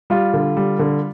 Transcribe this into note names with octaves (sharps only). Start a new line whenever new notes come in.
G3 F4
D3
G3
D3